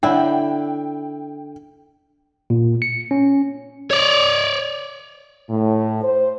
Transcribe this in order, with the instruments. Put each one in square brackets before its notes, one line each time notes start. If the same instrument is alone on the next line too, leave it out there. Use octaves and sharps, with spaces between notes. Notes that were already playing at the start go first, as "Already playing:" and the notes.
[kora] D3 E4 [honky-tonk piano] G5
[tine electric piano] A#2
C#7
C#4
[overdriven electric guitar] C#5 D5
[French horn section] A2
C5